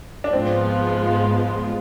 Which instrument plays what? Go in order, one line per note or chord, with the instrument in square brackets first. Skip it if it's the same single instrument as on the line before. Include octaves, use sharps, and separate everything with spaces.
[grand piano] D4
[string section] G#2 F3 G#3 B3 F4 [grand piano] C4